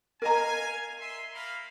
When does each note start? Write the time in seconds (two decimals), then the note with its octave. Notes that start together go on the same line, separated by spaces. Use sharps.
0.22 A#4 D#5 F5 G#5 A#5
0.99 E5 C6
1.33 A#3 F5 B5